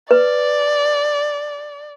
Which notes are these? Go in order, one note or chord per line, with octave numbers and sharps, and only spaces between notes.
B4 D5